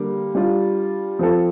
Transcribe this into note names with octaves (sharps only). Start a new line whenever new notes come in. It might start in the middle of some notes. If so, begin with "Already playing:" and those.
Already playing: D3 G3 A#3
G3 D4 F4
F3 C4 F4 A4